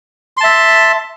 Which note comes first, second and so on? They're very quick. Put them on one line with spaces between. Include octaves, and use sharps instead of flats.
C6 A5 E5